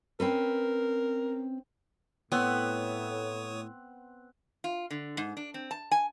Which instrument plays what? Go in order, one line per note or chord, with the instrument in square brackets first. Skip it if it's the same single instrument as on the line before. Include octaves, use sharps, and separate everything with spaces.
[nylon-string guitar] C4 C#4 B4 [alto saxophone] A#4
[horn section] A2 [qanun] B3 [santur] C4 F#5 E6 [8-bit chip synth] C#5 D#6
[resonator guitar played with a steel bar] F4
D3
G#2
D4
C4
A5
G#5